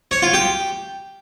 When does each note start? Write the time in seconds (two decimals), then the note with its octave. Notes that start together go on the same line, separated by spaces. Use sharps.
0.11 C#5
0.22 F4
0.34 G4